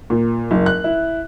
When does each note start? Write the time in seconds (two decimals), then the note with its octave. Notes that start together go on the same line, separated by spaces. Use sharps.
0.10 A#2
0.51 F#1
0.66 F#6
0.84 E4